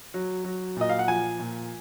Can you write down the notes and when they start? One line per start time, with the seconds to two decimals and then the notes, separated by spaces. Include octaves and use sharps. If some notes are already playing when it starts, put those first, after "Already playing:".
0.14 F#3
0.45 F#3
0.76 A#2 D#5
0.89 F5
0.99 F#5
1.08 F3 G#5
1.39 A#2